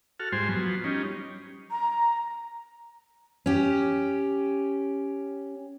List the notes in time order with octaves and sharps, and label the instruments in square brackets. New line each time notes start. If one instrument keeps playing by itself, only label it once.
[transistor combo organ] F#4 A4 F6
G#2 G3 F4 C5 G#5 C6
F3 F#3 B3
G3 C#4 D#4
[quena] A#5
[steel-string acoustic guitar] C#4 G4